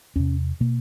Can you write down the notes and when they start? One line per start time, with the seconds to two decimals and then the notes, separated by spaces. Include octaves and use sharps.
0.16 E2 C3 C#4
0.60 B2 A#3